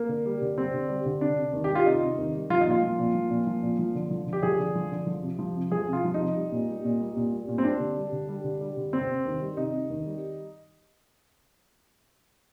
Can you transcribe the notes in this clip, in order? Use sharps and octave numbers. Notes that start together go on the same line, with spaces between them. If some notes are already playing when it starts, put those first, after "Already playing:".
Already playing: A#3
D3
G3
D3
G3 C4
D3
G3
D3
C3 D4
C3
D#3
G4
G3
F4
C3 D#4
C3
D#3
G3
F3 F4
D#4
A#2 F4
F3
A#2
F3
A#2
F3
A#2
F3
D3
F3
D3
G4
F3 G#4
D3
F3
D3
F3
C3
F3
C3
F3 G#4
C3 F4
F3
C3 D#4
G3
A#2
G3
A#2
G3
A#2
G3
A#2
C4
G3 D4
D3
G3
D3
G3
D3
G3
D3
C3 C4
C3
D#3
G3
C3 D#4
C3
D#3
G3